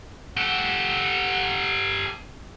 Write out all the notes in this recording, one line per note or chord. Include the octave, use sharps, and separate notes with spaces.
G4 A4 F#5